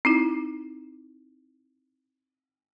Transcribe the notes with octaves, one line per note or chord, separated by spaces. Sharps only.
C4 D#4 E4